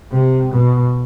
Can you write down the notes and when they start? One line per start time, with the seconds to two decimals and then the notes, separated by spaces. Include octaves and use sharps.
0.12 C3
0.52 B2